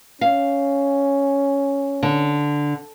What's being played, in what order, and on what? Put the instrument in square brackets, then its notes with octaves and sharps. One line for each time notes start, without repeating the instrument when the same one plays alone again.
[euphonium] C#4 [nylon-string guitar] F5
[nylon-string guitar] D3